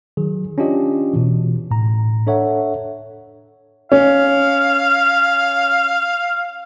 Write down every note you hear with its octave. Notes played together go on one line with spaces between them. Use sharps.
D#3 F#3 G#4
C#4 D4 F4 G4 D#5
B2 E3
A2 A#5
D4 A4 C#5 E5 F#5
C#4 F5